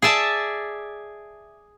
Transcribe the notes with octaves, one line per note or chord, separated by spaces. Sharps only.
G#4 D5 E5 A5